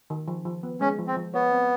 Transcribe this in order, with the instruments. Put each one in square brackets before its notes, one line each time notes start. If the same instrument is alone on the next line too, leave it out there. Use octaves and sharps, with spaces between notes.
[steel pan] D#3
F3
F3
B3
[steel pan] G#3 [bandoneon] C#4
[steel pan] F3
[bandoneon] C4
[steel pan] F3
[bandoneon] B3 [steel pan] C#5
[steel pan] C4